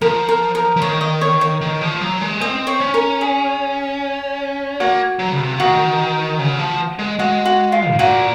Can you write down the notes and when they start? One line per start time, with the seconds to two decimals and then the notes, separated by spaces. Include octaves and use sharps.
0.01 F3 A#4
0.29 A#4
0.55 A#4
0.76 F3
0.82 D#3 C#5
1.01 D#5
1.21 C#5
1.41 C#5
1.61 D#3
1.81 F3
2.01 F#3
2.21 G#3
2.41 C4 D#5
2.67 C#5
2.80 C#4
2.94 A#4
3.21 G#4
4.80 A#3 F#4
5.19 F#3
5.32 C#3
5.40 C3
5.60 D#3 F#4
6.39 C#3
6.59 F3
6.99 G#3
7.19 G#3 F#4
7.45 F#4
7.72 F4
7.91 G#2
7.99 A#2 F#4